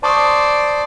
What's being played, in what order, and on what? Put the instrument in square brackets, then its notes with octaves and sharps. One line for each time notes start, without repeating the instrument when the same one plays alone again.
[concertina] C5 D5 [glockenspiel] A5 C#6 D#6